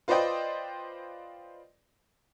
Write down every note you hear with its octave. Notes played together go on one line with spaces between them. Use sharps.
F4 B4 C5 D5 D#5 G5